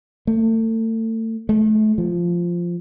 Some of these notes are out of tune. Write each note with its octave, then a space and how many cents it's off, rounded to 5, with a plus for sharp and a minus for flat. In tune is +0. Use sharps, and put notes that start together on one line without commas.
A3 +35
A3 -35
F3 -5